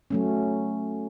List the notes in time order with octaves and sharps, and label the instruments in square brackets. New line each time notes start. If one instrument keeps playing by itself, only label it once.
[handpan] F#3 A3 C#4